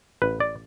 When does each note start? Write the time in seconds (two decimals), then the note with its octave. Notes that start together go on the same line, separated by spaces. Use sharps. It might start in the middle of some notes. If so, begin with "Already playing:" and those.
0.22 A1 B4
0.40 D5